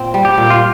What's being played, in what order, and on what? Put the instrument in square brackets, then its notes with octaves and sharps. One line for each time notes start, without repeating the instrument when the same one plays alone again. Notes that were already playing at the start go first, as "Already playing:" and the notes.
Already playing: [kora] A#2 C4
G3
[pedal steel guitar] G4
[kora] A#2
[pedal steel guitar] F4